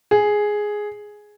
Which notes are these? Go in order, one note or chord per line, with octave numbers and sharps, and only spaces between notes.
G#4